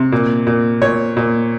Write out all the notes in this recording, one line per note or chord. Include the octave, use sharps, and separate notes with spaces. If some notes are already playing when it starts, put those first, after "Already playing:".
Already playing: C3
A#2
A#2
A#2 C#5
A#2